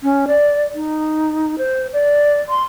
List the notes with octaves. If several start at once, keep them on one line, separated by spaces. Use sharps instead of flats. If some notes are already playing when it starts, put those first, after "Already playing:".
C#4
D5
D#4
C5
D5
C6